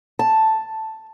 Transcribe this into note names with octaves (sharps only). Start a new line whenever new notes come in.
A5